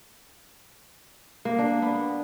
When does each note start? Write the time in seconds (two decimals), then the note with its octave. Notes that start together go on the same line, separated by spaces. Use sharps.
1.45 A#3
1.59 D4
1.82 B3